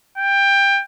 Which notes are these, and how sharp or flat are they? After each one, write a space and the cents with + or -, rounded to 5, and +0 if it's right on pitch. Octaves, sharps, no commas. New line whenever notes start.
G5 +20